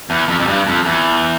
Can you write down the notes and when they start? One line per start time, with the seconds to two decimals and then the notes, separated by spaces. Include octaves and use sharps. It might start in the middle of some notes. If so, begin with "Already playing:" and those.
0.10 E2
0.28 F2
0.39 F2
0.47 G2
0.66 F2
0.85 E2